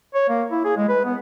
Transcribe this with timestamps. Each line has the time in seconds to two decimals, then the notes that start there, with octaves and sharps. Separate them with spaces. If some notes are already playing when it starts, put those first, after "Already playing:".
0.15 C#5
0.29 A#3
0.51 E4
0.64 G#4
0.77 G#3
0.89 B4
1.05 B3